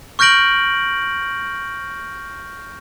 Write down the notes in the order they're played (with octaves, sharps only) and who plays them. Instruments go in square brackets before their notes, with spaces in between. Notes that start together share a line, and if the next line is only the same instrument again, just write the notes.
[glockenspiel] C#6 F6 G6 A#6 D7 F#7